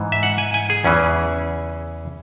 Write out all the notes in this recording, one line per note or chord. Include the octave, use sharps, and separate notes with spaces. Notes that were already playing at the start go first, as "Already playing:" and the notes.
Already playing: G#2 E3
E5
F#5
G#5
G#5
G#4
E2 C#3 E3 C#4